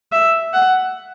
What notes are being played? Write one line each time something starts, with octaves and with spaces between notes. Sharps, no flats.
E5
F#5